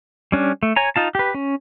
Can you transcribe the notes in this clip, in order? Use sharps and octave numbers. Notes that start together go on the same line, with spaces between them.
G3 C#4 D4
A3
C#5 G#5 A#5
D#4 F4 A5
G4 B4
C#4